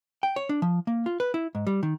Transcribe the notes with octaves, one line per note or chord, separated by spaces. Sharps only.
G5
C#5
D4
F3
A#3
F4
B4
E4
G#2
G3
D#3